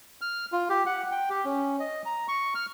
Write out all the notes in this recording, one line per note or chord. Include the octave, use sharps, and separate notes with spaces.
F6
F4
G4
F#5
G5
G4
C#4
D#5
A#5
C#6
F6